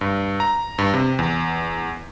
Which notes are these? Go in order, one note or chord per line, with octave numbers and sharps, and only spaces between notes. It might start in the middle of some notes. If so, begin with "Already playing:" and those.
G2
A#5
G2
C3
E2